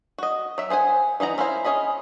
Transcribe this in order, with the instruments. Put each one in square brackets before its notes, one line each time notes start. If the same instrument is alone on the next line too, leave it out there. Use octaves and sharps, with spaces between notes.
[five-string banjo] F#4 D#5
F#3 E5
G#4 C5 F#5 G#5
E3 D#4 F#5 A#5
C#4 E4 F4 C5 A#5
C#4 G#4 D#5 B5